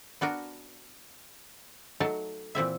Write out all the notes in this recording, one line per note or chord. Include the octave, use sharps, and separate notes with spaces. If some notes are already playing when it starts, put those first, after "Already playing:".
B3 D4 F#4 A#4
F#3 A3 D#4 A5
A#2 E3 C4 E5